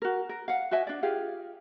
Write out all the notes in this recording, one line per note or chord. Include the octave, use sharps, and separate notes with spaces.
F#4 A#4
A#4
F5 F#5
F#4 D#5 E5 G#5
D4 D5
F4 G4 G#4 F5